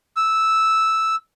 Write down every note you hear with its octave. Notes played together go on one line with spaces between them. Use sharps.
E6